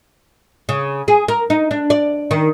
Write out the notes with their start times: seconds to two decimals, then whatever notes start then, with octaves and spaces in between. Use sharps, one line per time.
0.69 C#3
1.08 G#4
1.28 A#4
1.50 D#4
1.71 D4
1.90 D5
2.31 D#3